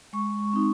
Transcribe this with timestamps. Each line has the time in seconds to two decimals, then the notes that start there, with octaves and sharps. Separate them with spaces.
0.13 G#3 C#6
0.53 C4 D#4